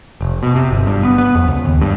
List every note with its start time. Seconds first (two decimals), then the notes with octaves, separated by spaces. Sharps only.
0.21 F1
0.43 B2
0.55 C3
0.71 G1
0.87 G2
1.05 B3
1.18 B3
1.35 F2
1.48 C#2
1.65 D#2
1.81 G2